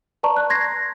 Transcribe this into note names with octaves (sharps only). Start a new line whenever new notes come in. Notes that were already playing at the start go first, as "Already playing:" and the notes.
B4 D5 A5 A#5 C#6
F#6
C6 G#6 A#6 C7